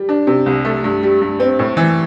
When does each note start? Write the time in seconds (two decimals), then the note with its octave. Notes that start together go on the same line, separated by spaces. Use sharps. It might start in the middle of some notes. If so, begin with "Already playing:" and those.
Already playing: G3
0.09 D4
0.27 C3
0.46 C2
0.65 A3
0.84 G2
1.03 G3
1.22 G2
1.40 C4
1.59 A2
1.77 E3